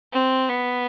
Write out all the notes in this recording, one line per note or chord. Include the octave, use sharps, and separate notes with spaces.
C4
B3